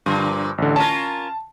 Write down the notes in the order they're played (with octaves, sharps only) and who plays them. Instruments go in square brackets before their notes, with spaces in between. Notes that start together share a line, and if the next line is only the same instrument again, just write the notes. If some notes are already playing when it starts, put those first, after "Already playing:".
[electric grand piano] G2 [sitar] A#2 D3 F3
[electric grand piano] A1 D3
[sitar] C#4 F4 A#4 [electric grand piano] A5